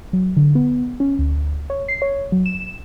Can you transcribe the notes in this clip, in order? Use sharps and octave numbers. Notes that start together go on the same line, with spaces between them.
F#3
D3
B3
C#4
D2
C#5
C7
C#5
F#3
E7